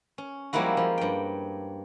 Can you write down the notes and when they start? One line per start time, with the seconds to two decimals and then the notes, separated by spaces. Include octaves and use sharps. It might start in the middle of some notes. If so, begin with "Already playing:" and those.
0.18 C#4
0.53 F3 G3 G#3 A#3 E4 F#4
0.77 F3
0.98 G2 G5